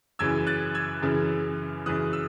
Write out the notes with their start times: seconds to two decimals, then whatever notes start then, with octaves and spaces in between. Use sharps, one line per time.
0.19 F#2 C#3 E3 E6 G#6
0.47 F#6 A6
0.75 E6 G#6
1.02 F#2 C#3 E3
1.86 F#2 C#3 E3 D#6 F#6
2.13 E6